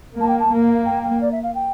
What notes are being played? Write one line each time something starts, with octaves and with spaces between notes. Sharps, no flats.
A#3 A5
G5
A5
A#3
F5
F5
G5
G5
D5
E5
F5
G5